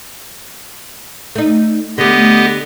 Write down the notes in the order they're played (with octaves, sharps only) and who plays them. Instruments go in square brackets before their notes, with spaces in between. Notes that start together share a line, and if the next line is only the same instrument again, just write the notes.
[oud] A3 D#4
[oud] D3 A3 [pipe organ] B3 G4 D#5